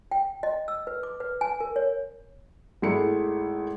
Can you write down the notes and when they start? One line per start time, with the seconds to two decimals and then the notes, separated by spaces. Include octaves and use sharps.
0.11 G5
0.43 D#5
0.68 E6
0.87 B4
1.03 D6
1.20 B4
1.41 G#5
1.60 A#4
1.76 C#5
2.82 G#1 G#3 A3 E4 C#7